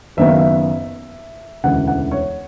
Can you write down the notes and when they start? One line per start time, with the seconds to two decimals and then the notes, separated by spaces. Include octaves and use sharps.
0.17 F#1 F#2 D#3 F#3 B3 E5
0.28 F5
0.39 E5
1.64 E1 D2 C#3 E3 F#5
1.87 F#5
2.11 C#5